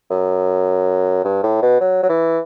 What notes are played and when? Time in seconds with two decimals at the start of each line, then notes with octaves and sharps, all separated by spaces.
0.10 F#2
1.24 G2
1.43 A2
1.62 B2
1.81 F#3
2.03 F#3
2.09 E3